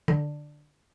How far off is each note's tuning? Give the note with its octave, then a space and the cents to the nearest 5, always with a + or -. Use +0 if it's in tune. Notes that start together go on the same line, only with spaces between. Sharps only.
D3 +10